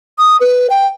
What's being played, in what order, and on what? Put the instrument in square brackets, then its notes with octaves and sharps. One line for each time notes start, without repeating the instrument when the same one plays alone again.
[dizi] D#6
B4
G5